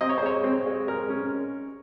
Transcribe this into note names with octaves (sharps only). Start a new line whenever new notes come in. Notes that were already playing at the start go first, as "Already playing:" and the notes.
C4 D#5
C#5
C5
G#3 C#5
C4
G#3
G#3 A#4
C#4